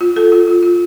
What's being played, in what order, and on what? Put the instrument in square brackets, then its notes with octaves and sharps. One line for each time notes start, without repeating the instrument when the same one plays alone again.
[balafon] F4
A4
F4
F4
F4